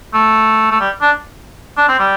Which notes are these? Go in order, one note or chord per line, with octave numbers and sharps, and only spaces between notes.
A3
A3
G3
D4
D4
C4
G3